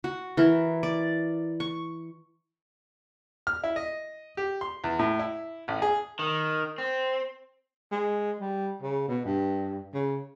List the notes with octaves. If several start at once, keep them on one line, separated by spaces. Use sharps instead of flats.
F#4
E3 A#4
D5
C#6
F6
E4
D#5
G4
C6
E2
A2
E4
A1
G#4
D#3
C4
G#3
G3
C#3
B2
G2
C#3